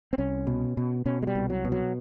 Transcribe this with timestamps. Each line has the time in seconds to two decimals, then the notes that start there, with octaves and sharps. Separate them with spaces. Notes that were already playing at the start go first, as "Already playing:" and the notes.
0.13 C4
0.18 C2 C#4
0.47 B2
0.77 B2
1.06 B2 C#4
1.22 G#3
1.27 G3
1.35 C2
1.50 F#3
1.65 B2
1.72 F#3